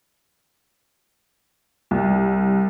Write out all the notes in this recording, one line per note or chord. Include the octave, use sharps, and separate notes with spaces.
C2